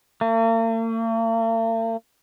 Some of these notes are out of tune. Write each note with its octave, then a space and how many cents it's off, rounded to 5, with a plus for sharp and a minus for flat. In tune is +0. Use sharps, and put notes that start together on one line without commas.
A#3 -45